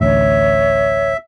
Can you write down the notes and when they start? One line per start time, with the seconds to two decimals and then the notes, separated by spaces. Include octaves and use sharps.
0.01 A1 D2 C#5 E5